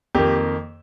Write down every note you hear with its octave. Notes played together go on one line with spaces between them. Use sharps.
F2 D#3 A#3 G4